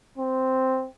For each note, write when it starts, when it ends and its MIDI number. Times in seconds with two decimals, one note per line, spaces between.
0.18 0.88 60